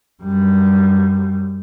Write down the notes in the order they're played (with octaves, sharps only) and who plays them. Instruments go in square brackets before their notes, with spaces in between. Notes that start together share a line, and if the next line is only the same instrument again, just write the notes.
[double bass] F#2 G3